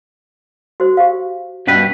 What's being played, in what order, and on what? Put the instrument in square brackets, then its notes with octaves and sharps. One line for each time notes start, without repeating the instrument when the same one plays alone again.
[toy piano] F#4 C5
G4 F5
[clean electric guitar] G2 B2 B4 [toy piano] C#4 D4